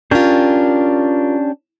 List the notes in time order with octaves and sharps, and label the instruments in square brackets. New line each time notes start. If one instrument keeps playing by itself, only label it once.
[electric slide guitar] C#4 D4 G4 [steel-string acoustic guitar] F4 A#4